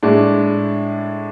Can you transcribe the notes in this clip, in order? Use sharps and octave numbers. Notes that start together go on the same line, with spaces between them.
A2 G#3 D4